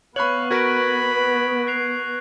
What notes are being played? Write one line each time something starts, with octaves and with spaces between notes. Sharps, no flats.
B3 C#5 F5 B5 C#6 F#6 F#7
F#4 A#4 B4 B5 G#6 A#6 D7
F#6 C7 F7